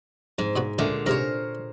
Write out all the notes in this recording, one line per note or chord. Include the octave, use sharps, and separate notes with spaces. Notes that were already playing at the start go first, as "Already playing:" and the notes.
F2 G#2
A#2 B3 F#4
C#2 A#2 D3 G#3 A3
G#2 C3 A#4 C5 C#5